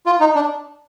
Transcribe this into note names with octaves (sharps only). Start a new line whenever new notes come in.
F4
D#4
D4